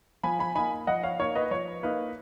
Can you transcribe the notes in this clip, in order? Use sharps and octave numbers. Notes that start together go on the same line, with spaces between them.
F3 G#5 B5
G#5 B5
A#3 D#4 G#5 B5
F3 D#5 F#5
C#5 F5
A#3 D#4 C#5
B4 D#5
F3 C#5
A#3 D#4 B4